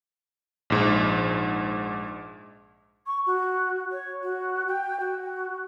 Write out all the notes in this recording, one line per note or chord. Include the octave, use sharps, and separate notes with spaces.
A#1 G#2
C#6
F#4
C#5
F#4
G5
F#4